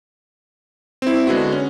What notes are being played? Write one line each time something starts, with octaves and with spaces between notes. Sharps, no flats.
C4 E4
D3 G#3 B3 F#4
C#4